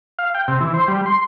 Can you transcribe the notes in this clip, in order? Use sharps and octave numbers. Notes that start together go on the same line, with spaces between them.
F5
G5
C3
E3
C5
G3
C6